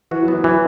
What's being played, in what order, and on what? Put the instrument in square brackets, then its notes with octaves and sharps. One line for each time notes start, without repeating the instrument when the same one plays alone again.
[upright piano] E3 [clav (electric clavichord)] F#4
[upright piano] F#3
[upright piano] E3 [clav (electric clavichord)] B3
[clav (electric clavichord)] E3 [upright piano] F#3